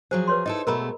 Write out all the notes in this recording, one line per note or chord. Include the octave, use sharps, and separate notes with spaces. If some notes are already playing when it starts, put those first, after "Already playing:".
F3 F#3 G#4 C5
B4 C#5 C6
D#4 E4 A4 D#5
B2 G#3 A3 A#4 A#5 B5